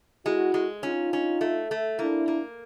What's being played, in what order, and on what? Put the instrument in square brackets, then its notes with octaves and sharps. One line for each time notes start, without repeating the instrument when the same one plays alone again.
[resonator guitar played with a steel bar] G#3 [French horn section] E4 F#4
[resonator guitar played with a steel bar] G#3
[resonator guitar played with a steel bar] C#4 [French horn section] D#4 F4
[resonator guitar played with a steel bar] C#4
A3
A3
[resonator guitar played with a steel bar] A#3 [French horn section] D4 E4
[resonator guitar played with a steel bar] A#3